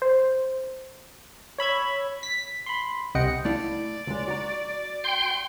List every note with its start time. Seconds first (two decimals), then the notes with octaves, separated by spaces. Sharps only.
0.02 C5
1.58 C#5 B5 E6 G#6
2.23 B6
2.66 B5 C6
3.15 C2 C3 D#5 F#5 G5 C#7
3.45 A3 E4 D5 F5
4.07 C#2 G#3
4.28 F#4 A#5
5.04 G5 C6